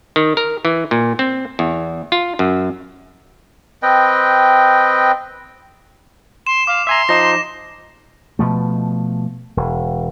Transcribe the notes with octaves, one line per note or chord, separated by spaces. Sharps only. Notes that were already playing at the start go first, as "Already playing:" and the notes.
D#3
A#4
E3
A#2
C4
E2
F4
F#2
C4 B4 D#5 G5
C6 E7
F5 D6
E5 G#5 A#5 C6
F3 D#4 A#6 E7
B2 F3 A3
E1